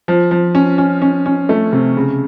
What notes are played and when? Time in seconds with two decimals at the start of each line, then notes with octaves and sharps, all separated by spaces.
0.08 F3
0.31 F3
0.55 C#4
0.78 C#4
1.02 C#4
1.26 C#4
1.49 A3
1.73 C3
1.97 C#3